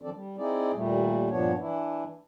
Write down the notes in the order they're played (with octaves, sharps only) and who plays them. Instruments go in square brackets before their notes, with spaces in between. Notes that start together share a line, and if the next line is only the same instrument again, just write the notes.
[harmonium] D#3 F3 C4 D4 A4 D5
G3
C4 D#4 E4 G#4 D5
D#2 A#2 G3 A3
G2 A#2 F3 B3 D4 C#5
E3 D4 E4